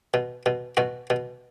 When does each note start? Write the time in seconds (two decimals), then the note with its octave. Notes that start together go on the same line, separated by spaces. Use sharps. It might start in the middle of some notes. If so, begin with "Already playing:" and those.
0.14 B2
0.46 B2
0.77 B2 F#4
1.10 B2